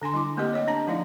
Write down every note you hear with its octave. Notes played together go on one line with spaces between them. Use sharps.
D3 D4 G#5 C6
G3 E4 D6
A3 A#3 C4 G4 A#4 D#5
C#5 D#5 F#5
D4 A5 A#5
F3 A3 D#4 E4 D5 F5